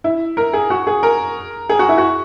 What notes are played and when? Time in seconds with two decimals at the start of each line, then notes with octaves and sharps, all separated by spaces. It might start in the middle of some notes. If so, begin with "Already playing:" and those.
0.04 E4
0.37 A#4
0.53 G#4
0.70 F#4
0.87 G#4
1.03 A#4
1.69 G#4
1.79 F#4
1.89 E4
1.98 F#4